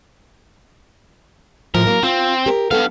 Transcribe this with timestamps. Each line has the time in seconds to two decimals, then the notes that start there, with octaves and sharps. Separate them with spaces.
1.75 A2 F3 A#4
1.87 F#3 A#3
2.03 C4 F4
2.46 G4 A#4
2.71 G2 B3 A4 F5